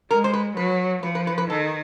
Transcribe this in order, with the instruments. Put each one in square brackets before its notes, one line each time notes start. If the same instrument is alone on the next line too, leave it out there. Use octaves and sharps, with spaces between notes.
[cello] G#3 [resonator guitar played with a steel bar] A#4
[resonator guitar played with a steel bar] C5
B4
[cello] F#3 [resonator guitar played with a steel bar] B4
[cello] F3 [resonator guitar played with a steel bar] B4
[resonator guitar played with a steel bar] B4
B4
B4
[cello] D#3 [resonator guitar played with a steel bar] A4